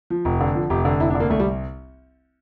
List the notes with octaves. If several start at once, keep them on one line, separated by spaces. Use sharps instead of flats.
F3
F1
D3
F3
F1 G4
D3
F1 E4
D4
D3
A#3
C2 A3
G3